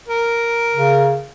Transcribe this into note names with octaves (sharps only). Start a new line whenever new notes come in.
A#4
C#3